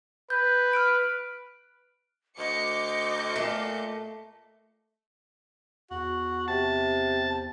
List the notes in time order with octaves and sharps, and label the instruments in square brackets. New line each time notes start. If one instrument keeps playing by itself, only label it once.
[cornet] B4 [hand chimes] G6
[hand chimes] F6 F#6 D7
[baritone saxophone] D2 [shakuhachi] D#5 [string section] D6 G6 C#7
[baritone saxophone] A#2 [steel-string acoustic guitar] A3
[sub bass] E2 [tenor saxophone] F#4
[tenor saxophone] C3 [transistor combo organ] A5